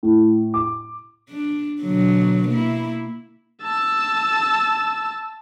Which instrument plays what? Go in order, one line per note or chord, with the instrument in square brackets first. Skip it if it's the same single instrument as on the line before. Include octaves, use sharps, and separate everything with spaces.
[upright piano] A2
D6
[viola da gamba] D4
B2 D3 F#3
A#3 E4
[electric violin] A5 E6